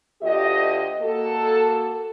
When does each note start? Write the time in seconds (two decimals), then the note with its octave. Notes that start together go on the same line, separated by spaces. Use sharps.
0.22 D2 F4 G4 D#5
1.01 A#3 F#4 A4